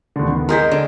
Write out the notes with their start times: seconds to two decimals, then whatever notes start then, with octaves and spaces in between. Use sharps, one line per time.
0.16 D#2 B2 D3
0.28 D#3 B3
0.49 G#3 G#4 A#4 C6 G6 B6
0.71 D3